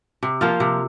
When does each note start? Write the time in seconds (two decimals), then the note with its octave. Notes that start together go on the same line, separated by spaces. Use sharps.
0.23 C3
0.41 F3 A#3 F4
0.60 C3